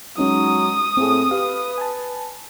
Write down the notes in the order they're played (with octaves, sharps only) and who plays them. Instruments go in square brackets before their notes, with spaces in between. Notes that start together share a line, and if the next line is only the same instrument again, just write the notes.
[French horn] F#3 [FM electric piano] G#3 C#4 D#4 [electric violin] D#6
[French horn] A2 [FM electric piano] C4 G#4
[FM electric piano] G4 F5 [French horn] B4
[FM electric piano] G#5 A5